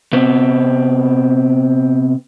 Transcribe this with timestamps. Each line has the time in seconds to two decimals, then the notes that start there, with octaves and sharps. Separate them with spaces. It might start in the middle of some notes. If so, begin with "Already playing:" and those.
0.12 C3 B3 C4 B4